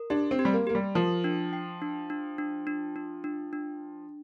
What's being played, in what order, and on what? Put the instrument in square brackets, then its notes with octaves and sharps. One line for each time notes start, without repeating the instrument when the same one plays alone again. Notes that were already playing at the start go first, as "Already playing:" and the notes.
Already playing: [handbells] A#4
[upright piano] D4 [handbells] G4
[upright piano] C4
[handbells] G4
[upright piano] G3
A#3
[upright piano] A#3 [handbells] G4
[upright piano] G3
[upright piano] F3 [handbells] A#4
[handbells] D4
G5
D4
D4
D4
D4
D4
D4
D4